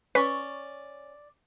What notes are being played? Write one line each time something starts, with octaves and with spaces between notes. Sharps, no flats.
C#4 B4 D5 C#6